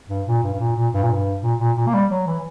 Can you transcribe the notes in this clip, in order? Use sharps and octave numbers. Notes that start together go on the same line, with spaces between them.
G2
A#2
G2
G2
A#2
A#2
G2
A#2
G2
A#2
A#2
A#2
A#3
G3
F#3
E3